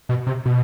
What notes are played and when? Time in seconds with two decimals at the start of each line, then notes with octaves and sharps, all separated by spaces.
0.09 B2
0.27 C3
0.46 B2